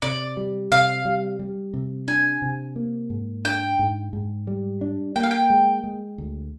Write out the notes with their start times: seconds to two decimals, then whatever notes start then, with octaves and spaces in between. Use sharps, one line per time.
0.02 C3 D5
0.37 G3
0.72 C3 F5
1.05 G3
1.39 G3
1.74 C3
2.08 D4 G#5
2.42 C3
2.76 A#3
3.10 G#2
3.45 D4 G5
3.79 G#2
4.13 G#2
4.47 G3
4.81 D4
5.16 A#3 G5
5.23 F5
5.31 G5
5.50 G#3
5.84 G#3
6.18 D2